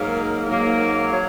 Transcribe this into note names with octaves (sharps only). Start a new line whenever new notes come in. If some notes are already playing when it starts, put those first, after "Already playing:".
Already playing: G#2 F#3 A#3 A#4
G#2 F#3 A#3
F#3